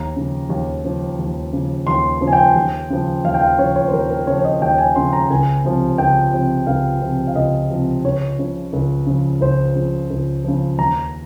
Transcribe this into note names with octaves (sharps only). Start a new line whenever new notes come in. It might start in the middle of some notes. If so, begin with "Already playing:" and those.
Already playing: D#2 A#5
C#3 F3
D#2
C#3 F3
D#2
C#3 F3
D#2 C6
C#3 F3
G#5
G5
D#2
C#3 F3
D#2 F5
G5
F5
C#3 F3 C#5
C#5
C5
D#2 A#4
A#4
C#3 F3 C#5
C#5
D#5
D#2 G5
G#5
C#3 F3 C6
A#5
C#2 G#5
C3 F3
C#2 G5
C3 F3
C#2 F5
C3 F3
F5
C#2 D#5
C3 F3
C#2 C#5
C#3 F3
C#2
C#3 F3
C#2 C5
C#3 F3
C#2
C#3 F3
D#2 A#5